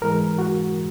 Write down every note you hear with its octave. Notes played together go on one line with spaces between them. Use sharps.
G#2 E3 G#3 A#4
F#4